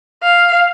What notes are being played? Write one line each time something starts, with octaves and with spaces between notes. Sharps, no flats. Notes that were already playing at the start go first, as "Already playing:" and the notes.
F5